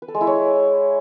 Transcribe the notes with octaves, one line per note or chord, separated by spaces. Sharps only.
B4
A4
G#3
E4
C#5